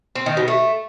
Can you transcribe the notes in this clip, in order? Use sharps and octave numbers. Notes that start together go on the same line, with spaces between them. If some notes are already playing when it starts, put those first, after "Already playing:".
C4
D#3
B2
A3